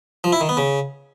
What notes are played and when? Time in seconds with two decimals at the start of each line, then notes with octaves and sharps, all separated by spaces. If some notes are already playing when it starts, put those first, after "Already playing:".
0.24 F3
0.32 E4
0.41 D#3
0.49 B3
0.57 C#3